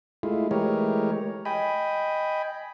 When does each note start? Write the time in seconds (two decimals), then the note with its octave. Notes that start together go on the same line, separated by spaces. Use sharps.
0.23 G#3 A3 E4 F4
0.51 E3 G#3 A3 G4 A#4 C#5
1.45 D#5 G5 G#5 B5